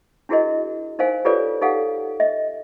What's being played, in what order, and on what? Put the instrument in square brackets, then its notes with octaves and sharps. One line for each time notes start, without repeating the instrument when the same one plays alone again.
[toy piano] D4 E4 F#4 G#4 A#4 D#5
D#4 A#4 C5 F5 G#5
F4 G4 A4 B4 C#5 D5
D#4 G4 A4 F5 F#5
D#5 E5